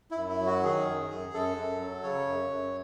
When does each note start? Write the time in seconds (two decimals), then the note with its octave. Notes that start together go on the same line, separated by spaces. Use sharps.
0.11 E4
0.16 F#2
0.29 E4
0.40 F#3
0.46 F#4
0.63 D#3 G#4
0.86 F#2
1.11 F#2
1.33 F#2 A4
1.56 F#2
1.81 F#3
2.03 C#3 C#5
2.27 F#2
2.50 F#2